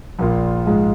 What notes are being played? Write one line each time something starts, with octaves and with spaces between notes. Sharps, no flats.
A#1 A#2 A#3 F4
A#1 G#2 G#3 F4 G#4